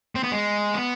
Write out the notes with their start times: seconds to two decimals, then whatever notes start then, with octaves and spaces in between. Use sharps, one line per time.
0.15 C4
0.24 B3
0.32 G#3
0.74 B3